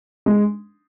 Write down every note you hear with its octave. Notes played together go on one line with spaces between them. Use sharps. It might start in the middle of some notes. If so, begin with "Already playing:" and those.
G#3